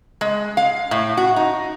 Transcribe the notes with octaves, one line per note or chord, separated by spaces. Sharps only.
G#3
F5
A2
F#4
D#4